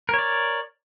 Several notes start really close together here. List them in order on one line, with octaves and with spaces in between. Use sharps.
A#4 C#5 D5